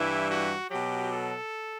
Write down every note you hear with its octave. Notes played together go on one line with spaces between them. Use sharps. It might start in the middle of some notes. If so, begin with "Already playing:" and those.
Already playing: G2 E3 G3 E4
F#4
B2 F#3 G4
A4